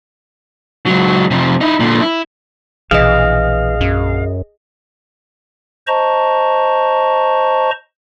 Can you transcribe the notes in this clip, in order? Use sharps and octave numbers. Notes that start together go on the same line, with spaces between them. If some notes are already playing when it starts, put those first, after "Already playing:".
C#2 F#3
F2 C3
D#4 E4
A#2 D3
E4
A#1 B2 E3 G#4 D#5 F5
F#2
C5 D#5 A5 A#5 C#6